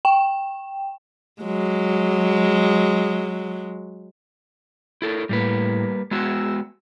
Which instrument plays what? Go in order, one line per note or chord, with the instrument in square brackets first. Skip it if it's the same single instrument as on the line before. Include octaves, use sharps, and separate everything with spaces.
[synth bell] G5
[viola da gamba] F#3 G#3
[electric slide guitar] E4 A4 A#4
[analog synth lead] A2 [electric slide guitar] G3 A#3 B4
[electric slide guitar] G#3 B3 F#4 [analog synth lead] E6